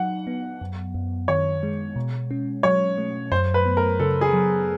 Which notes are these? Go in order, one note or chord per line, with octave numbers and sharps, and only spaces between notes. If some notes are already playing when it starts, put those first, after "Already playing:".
Already playing: F#3 D#4 F#5
B3
F#2
F#2
D#3 C#5
G#3
B2
C#4
F#3 C#5
A3
F#2 C5
B4
B3
A#4
C#3 A4
G#4
F#3